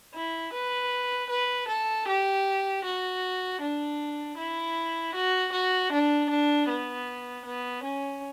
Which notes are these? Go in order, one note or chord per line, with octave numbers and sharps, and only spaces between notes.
E4
B4
B4
A4
G4
F#4
D4
E4
F#4
F#4
D4
D4
B3
B3
C#4